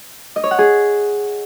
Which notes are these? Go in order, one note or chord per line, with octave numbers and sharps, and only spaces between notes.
D#5
C#5
F#5
G#4